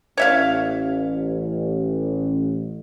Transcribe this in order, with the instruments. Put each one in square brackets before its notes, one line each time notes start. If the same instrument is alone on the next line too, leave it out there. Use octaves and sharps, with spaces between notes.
[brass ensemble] A1 [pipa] C#5 E5 F5